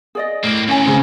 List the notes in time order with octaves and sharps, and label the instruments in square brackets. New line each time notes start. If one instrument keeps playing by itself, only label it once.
[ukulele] G#4 D5 D#5
[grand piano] A2 [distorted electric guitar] A#3 C4
[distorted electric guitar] D2 D#3 [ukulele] C#4 C#5 G#5
[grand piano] C#3 C4